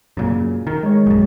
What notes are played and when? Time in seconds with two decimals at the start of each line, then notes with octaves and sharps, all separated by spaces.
0.17 F#2 A#2 C#3
0.67 D#3 A#4
0.83 G#3 C#5
1.06 A#1 F#2